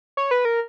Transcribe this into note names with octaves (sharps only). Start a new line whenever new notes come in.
C#5
B4
A#4